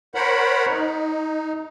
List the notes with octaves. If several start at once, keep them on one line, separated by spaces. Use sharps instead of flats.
A#4 C5 C#5 F#5 B5
D#4